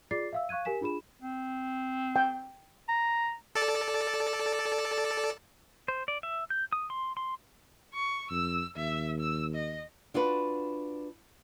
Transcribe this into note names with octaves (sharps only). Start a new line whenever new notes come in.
F4 G#4 D5 D6 A6 C7
E5 F5 E6
F5 C#6 F#6 G#6 D#7
G4 A#4 G#5 B6 E7
D4 F4 G#4 B5 E7
C4
G5
A#5
A4 D5 A5
C5
D5
E5
G6
D#6
C6
C6
C#6
F2 E6
D#2 E5
E6
D#5
D4 F4 F#4 B4